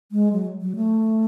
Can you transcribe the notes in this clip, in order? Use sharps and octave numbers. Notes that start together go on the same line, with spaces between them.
G#3
F#3
F#3
A3